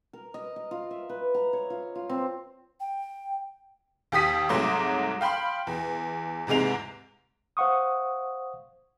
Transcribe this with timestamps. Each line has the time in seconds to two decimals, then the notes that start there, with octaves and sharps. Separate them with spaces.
0.13 A#4
0.34 D#5
0.56 D#5
0.71 F4
0.91 E5
1.09 B4
1.34 A#5
1.53 C#5
1.70 F4
1.95 F4
2.09 C4
2.80 G5
4.12 D#2 G4 D#6 B6 D#7
4.49 C2 G#2 F#3 A3 C6 D6
5.21 F5 G5 B5 C6
5.67 E2
6.47 E2 G#2 C3 G#3 F7
7.57 C5 F5 F#5 C#6 D#6